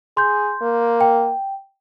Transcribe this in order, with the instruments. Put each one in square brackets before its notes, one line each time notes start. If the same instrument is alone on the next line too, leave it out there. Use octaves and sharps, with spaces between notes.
[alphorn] G#4 [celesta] C6 G6
[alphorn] A#3
[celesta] G5